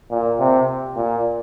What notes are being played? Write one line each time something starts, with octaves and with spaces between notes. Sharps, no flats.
A#2
C3
A#2